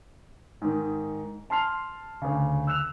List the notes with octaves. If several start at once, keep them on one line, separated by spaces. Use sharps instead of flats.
G#2 D#3
A5 C6 F6 C7 F7
D2 C#3
E6 F#6 E7 F7